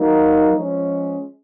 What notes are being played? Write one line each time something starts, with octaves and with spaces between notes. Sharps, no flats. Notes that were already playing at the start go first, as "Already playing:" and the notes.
Already playing: F#3 A#3 D#4
F3 G#3 C#4